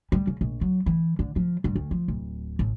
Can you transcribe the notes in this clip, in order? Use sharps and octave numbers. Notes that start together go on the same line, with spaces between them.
G3
C#3
A#1
F#3
E3
D3
F3
G2
D2
F3
D1
A1